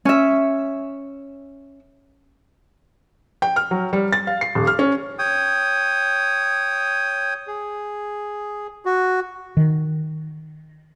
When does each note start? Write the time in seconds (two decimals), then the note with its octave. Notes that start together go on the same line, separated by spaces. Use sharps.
0.05 C#4 E5
3.42 G5
3.56 F6
3.71 F#3
3.93 G3
4.13 A6
4.27 F5
4.41 C7
4.55 D#1
4.67 F6
4.79 C#4
5.19 C#5 G5 D#6
7.47 G#4
8.85 F#4
9.57 D#3